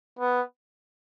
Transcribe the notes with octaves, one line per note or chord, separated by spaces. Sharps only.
B3